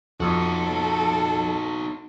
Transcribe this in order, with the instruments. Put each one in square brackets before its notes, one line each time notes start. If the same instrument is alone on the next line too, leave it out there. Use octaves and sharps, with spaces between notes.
[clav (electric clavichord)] F2 [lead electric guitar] D#4 F#4 [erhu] A4